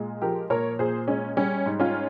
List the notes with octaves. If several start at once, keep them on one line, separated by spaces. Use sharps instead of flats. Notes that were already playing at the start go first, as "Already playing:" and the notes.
Already playing: A#2 G#3
F3 G4 A#4
A#2 A#4 C#5
A#2 G#4 C5
G#3 C#4
G3 C#4
G#2
C#4 F4